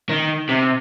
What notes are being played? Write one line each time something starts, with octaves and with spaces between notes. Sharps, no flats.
D#3
C3